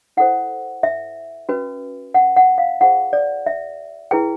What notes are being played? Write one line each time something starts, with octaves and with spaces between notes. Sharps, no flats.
E4 A4 C5 F#5
E5
C#4 F#4 B4
F#5
F#5
F5
F4 G#4 C5 F#5
D5
E5
E4 G#4 B4 G5